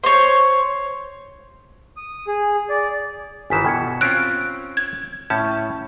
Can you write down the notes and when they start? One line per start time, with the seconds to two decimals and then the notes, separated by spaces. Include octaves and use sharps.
0.04 C5 C#5
1.97 D#6
2.27 G#4
2.70 D5
3.50 G1 D#3 E3 G#5 B6 E7
3.65 B2 G5 G#6 C#7
4.01 C4 C#4 F4 F#6 D7
4.77 G#6
5.30 A2 C#4 A5 G6